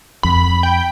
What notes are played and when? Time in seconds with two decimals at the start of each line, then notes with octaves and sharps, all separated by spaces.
0.23 F2 B5
0.63 G5